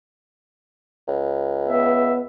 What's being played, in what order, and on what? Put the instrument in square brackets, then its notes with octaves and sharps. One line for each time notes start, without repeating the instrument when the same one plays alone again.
[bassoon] C#2
[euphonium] B3 [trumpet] E5